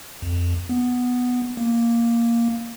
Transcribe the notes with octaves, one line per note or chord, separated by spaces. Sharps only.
F2
B3
A#3